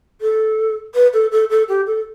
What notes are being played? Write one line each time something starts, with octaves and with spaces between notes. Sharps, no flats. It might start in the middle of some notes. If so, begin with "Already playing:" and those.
A4
B4
A4
A4
A4
G4
A4